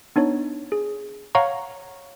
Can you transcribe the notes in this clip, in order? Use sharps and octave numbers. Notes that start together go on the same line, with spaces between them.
B3 D4 D#4 C#5
G#4
C#5 F5 F#5 A#5 C#6